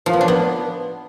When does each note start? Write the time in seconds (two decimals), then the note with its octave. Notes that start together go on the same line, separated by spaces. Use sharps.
0.06 F3
0.13 B3
0.21 D4
0.28 B3